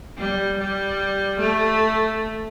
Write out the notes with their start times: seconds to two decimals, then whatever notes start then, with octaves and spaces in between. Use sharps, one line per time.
0.18 G3
0.59 G3
1.40 A3